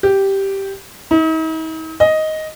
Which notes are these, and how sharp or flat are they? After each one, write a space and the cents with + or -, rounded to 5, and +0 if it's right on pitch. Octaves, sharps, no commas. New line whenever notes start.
G4 -5
D#4 +45
D#5 +5